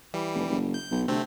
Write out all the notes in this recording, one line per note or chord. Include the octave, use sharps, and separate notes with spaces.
E3 G3
F1
F#1
G6
B1
D2 C3 A3 C4